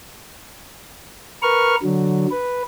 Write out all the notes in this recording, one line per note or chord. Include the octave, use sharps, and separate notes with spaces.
A#4 B4 C#6 F6
D3 F#3
B4